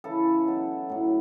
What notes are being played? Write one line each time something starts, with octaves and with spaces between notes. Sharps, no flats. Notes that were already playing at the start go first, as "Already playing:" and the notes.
C#3 E3 A4
B2 F#3
A2 F#3